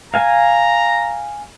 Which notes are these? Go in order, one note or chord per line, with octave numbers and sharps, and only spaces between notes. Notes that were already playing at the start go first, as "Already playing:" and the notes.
F5 G#5 A#5